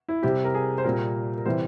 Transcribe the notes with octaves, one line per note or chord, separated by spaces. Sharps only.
E4
C3 G3 G4
A#4
G#4
C5
A#2 G3 A#4
A#4
C3 E3 G3 C5